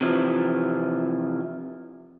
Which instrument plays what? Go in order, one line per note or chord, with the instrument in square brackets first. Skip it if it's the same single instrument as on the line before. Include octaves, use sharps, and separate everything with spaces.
[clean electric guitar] C3 E3 F3